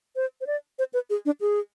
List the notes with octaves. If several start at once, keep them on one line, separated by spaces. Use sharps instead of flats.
C5
C5
D5
C5
B4
G#4
D4
G#4